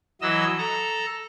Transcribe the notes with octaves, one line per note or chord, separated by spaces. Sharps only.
E3 F#3 D#5 E6
A4 A#5